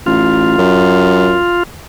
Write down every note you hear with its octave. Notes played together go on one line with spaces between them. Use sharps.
A1 F4
F#2